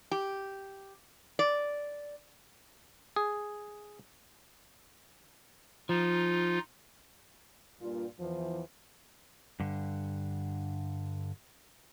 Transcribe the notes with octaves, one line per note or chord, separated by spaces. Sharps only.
G4
D5
G#4
F3 D#4 F4
G2 A#2 F4
E2 E3 F3
G2 D3